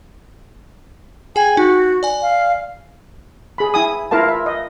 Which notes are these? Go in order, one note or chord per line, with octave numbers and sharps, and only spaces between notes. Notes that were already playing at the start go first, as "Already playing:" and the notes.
G#4 G5 G#5
D#4 F#4
D5 G#5
F5
G#4 B5
E4 G#5 D#6
E4 F4 A#4 F5 A5
E5
D#5